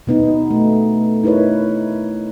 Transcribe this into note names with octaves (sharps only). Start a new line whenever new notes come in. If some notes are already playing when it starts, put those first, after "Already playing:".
B2 B3 D#4
A3
D#4 E4 A#4 B4 C#5